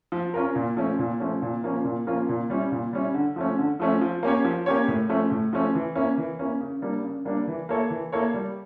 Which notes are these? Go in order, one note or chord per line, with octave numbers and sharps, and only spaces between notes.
F3
C#4 F4 A#4
A#2
F3 A3 C#4
A#2
F3 A3 C#4
A#2
F3 A#3 C#4 F4
A#2
F3 A#3 C#4 F4
A#2
G3 C#4 E4
A#2
G3 C#4 E4
D3
F3 A3 C#4
D3
F3 A3 C#4
F3
A#3 C#4 G4 C#5
F3
A#3 C#4 G4 C#5
A2
F3 A3 C#4
A2
F3 A3 C#4
E3
A#3 C#4 E4
E3
A#3 C#4 E4
C#3
G3 A#3 D4
C#3
G3 A#3 D4
E3
A#3 E4 A4 C#5
E3
A#3 E4 A4 C#5
G3